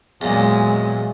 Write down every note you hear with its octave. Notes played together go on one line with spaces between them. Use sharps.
E2 A#2 F#3 G#3